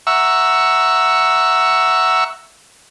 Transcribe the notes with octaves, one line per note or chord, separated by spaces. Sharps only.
E5 F#5 A#5 C#6 E6